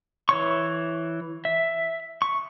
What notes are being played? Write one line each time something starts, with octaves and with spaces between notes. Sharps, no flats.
E3 C#5 C#6
E5
C#6